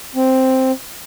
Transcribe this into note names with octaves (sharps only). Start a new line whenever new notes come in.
C4